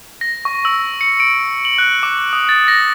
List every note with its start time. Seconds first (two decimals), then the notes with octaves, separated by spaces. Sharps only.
0.21 A#6
0.45 C#6
0.65 E6
1.01 C#7
1.20 D7
1.65 F#7
1.78 F#6
2.03 D6
2.33 D#6
2.49 A6
2.68 A#6